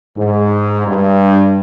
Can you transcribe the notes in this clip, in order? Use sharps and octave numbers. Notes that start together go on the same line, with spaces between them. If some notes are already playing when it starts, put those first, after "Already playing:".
G#2
G2